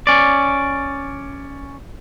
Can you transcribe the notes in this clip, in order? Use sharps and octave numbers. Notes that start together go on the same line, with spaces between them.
C#4 D5